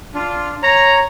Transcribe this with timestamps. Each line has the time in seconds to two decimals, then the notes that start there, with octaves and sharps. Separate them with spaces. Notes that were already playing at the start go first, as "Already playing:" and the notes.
0.14 D4 F4
0.63 C#5 A#5